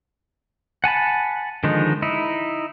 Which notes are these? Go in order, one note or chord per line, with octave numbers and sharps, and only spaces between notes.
F#5 G#5 A5 B5
D3 D#3 F3 G#3 D#4
D#4 E4